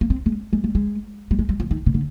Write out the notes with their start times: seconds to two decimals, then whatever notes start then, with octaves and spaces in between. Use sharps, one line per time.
0.01 A#3
0.10 C4
0.26 G#3
0.53 G#3
0.64 G3
0.75 G#3
1.31 G3
1.39 G#3
1.49 G3
1.60 F3
1.71 D#3
1.86 C3
1.94 D3